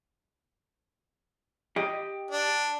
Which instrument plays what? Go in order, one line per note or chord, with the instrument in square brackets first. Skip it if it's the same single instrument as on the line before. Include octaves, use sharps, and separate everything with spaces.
[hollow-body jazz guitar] G4 D#5
[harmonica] D4